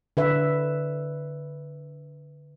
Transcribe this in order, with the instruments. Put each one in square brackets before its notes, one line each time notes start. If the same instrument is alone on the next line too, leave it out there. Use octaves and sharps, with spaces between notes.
[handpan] D3 B4 E5